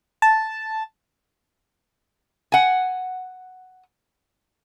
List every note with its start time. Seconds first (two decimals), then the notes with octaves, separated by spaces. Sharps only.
0.22 A5
2.52 F#5 G#5